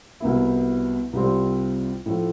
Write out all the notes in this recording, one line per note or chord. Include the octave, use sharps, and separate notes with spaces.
C2 B2 B3 E4
C2 C3 G3 C4 F4
A2 F3 A3